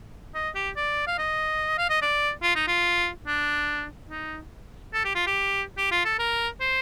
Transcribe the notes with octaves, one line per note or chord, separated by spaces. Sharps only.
D#5
G4
D5
F5
D#5
F5
D#5
D5
F4
D#4
F4
D4
D#4
A4
G4
F4
G4
G4
F4
A4
A#4
C5